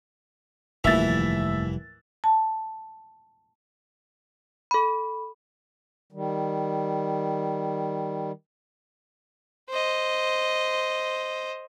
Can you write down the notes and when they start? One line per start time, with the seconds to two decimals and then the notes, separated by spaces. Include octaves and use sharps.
0.84 F1 D#2 A2 E3 F3 G3 E5 A6
2.24 A5
4.71 A4 B5
6.12 D#3 G3
9.70 C5 D#5